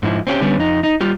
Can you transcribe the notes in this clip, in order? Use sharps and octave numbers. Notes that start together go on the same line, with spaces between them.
G#2 F3 E4
C4 C#4 F#4 G4
D3 G3 B3 C#4
F2 D#4
D#4
G3 F4 G4